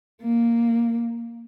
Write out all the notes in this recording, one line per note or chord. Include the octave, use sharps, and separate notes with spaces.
A#3